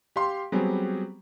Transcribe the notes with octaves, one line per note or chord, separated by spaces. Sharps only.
G4 F5 C6
F#3 G3 B3 C4 G4 G#4